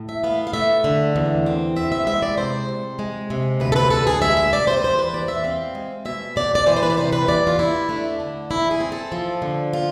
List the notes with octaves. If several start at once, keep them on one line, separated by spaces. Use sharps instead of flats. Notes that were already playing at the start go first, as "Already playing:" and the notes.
Already playing: A2
E5
B3 F5
F5
A3 E5
D3
E2
C4
B3 E5
E5
G#3 E5
D5
C3 C5
C3
G#3
C3
D2 B4
A4
B4
D2 A4
G#4
G#3 E5
E5
C3 D5
C5
B4
E2 C5
B4
E2 D5
E5
C4 F5
G#3
B2 E5
B2 D5
D5
E3 C5
C5
B4
D5
C3 C5
B4
E2 D5
F4
E2 E4
A3 D4
D3
E2 E4
G#4
C4
A4
F3
D3
F4